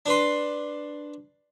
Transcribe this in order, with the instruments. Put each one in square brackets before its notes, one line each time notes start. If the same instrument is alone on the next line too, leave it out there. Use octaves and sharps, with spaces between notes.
[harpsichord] D4 B4 C6